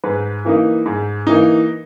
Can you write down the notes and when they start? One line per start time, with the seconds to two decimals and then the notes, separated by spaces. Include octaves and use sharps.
0.04 G#2 B4
0.45 E3 A#3 D#4
0.86 G#2
1.27 E3 A#3 D#4